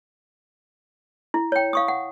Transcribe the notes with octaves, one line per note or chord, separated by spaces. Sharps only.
E4
C#5 G5
F5 C#6 D#6
F#5